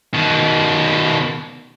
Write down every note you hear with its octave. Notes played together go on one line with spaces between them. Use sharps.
B2 D#3